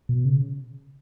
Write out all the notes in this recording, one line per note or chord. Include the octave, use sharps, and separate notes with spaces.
B2
C#3